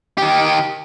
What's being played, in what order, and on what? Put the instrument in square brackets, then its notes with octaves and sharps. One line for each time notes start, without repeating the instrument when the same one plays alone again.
[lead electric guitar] D#3 G4